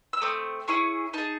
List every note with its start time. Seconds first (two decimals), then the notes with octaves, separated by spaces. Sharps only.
0.13 E6
0.22 A3 C4 D#6
0.68 C#4 E4 G#4 C#6
1.13 D#4 G#4 A5